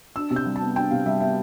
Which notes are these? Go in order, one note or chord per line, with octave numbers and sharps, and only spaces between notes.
D4 E6
C3
G6
G3
A5
B3
D4 G5
C3 F5
G3 E5
B3 E5